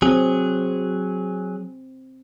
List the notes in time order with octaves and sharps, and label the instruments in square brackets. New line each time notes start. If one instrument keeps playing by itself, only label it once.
[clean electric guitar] F#3 G#4 [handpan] C4